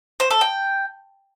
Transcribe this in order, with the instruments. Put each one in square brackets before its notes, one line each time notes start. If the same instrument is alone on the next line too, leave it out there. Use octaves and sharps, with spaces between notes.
[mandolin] C5
A4
G5